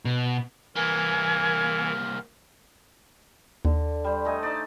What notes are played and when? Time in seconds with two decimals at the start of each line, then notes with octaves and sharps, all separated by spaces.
0.05 B2
0.76 C2 E3 A#3 G#5 F6
3.65 D#2 D3
4.04 G3 C5
4.25 A3 D#5 G#5
4.43 D#4 C5 D5